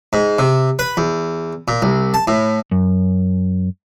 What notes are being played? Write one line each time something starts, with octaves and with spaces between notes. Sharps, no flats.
G#2
C3
B4
E2
A#2
C2
A5
A2
F#2